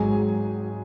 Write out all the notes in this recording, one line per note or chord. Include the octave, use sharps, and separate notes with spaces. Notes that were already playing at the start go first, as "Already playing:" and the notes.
Already playing: G#1 G#2 F#3 G#4 G#5